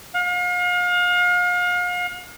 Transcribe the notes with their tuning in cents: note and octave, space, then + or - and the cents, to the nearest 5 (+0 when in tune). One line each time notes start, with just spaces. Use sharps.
F5 +40